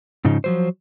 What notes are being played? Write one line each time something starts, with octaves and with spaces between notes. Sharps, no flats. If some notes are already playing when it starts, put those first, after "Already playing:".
G#2 C#3 F3 D#4
F3 F#3 C5